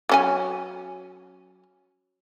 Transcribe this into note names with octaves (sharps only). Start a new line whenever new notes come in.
F#3 C#4 G#5